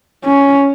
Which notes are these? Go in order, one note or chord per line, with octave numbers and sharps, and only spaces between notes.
C#4